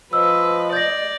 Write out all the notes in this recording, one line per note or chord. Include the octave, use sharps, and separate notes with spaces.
F3 B4 D#5 E6
D5 G6 A#6